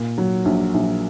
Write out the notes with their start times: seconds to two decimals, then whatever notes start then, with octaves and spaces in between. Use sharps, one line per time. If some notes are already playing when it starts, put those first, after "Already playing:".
Already playing: A#2
0.18 F#3
0.45 A#1
0.74 A#1